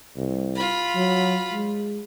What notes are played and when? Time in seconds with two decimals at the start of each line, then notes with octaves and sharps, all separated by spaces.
0.16 C2
0.55 F4 B5
0.96 F#3
1.52 G#3